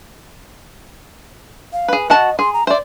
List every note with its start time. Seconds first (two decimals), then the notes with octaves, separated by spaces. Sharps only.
1.73 F5
1.88 G#4 B4
2.10 F#4 D#5 F#5 A5
2.39 G#4 C6
2.53 A#5
2.67 C5 D5 E5